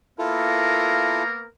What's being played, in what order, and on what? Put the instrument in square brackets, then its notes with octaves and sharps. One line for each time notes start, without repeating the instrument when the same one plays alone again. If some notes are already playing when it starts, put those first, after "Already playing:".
[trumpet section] A#3 B3 A#4 [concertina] E4 F4 A4